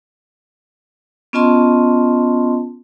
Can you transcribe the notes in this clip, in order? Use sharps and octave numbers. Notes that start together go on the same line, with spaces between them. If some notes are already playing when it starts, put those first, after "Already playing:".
B3 C#4 F4 D#5 A5 C6